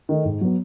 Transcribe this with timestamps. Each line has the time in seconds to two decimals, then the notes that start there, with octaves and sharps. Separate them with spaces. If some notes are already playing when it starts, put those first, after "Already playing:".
0.09 D#3 A3 D#4
0.25 G#2
0.41 F#3 B3